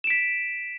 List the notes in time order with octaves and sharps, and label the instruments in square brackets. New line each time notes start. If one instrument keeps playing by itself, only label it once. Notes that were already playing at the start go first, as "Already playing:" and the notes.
[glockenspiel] E7
D7
B6